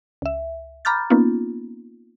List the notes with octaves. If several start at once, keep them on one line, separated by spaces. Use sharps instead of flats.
C#2 E5
A#5 B5 D6 F6 G6 A6
A#3 B3 C#4 D#4 F4